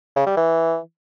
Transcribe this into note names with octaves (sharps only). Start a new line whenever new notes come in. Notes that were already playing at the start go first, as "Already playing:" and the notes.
C#3
G3
E3